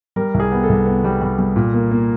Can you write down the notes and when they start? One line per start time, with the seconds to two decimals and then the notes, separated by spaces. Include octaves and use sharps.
0.16 G3 A#4
0.34 C2
0.40 G#4
0.52 B3
0.63 A4
0.69 C2
0.86 B3
1.04 G3
1.22 G3
1.39 G3
1.56 A#2
1.74 A#3
1.91 A#3